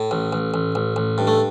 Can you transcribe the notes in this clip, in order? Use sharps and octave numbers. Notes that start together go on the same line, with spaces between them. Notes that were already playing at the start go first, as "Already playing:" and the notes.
Already playing: A2
A1
A1
A1
A1
A1
G2
A3